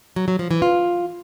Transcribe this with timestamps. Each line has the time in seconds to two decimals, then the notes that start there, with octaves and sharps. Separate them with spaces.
0.16 F#3
0.28 F#3
0.39 F3
0.51 E3
0.62 F4